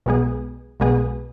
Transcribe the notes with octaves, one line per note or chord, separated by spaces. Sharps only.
B1 B2 G#3 B3 G#4
B1 B2 G#3 B3 G#4